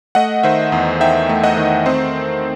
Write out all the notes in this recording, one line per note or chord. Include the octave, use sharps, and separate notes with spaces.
A3 D#5 F#5
D#3 C5 E5
E2
D#4 E5 G5
A3
D#5 F#5
D#3
C4 C5